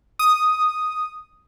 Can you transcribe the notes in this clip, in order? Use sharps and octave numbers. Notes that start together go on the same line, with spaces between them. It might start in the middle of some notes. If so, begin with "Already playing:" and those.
D#6